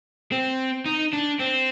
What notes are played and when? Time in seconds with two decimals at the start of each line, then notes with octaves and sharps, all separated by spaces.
0.32 C4
0.86 D#4
1.13 D4
1.40 C4